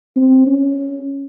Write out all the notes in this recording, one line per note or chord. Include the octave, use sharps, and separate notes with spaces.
C4
C#4